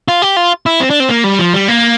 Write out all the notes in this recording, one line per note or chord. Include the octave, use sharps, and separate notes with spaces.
F4
G4
F4
E4
C4
D4
C4
A#3
G3
F3
G3
A#3